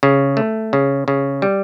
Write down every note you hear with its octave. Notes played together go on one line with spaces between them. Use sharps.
C#3
A3
C#3
C#3
G3